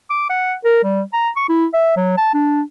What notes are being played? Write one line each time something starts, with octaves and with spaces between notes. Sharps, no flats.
D6
F#5
A#4
G3
A#5
C#6
E4
E5
F#3
A5
D4